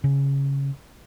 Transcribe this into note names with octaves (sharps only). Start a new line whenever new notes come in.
C#3